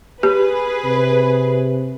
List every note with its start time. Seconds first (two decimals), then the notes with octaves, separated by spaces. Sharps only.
0.23 G4 G#4 B4
0.84 C3